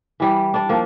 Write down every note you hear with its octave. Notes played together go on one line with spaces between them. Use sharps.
E3 G3
D4 D5
F3 A#3